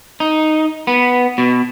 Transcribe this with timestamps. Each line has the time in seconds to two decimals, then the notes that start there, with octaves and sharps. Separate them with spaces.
0.20 D#4
0.87 B3
1.38 B2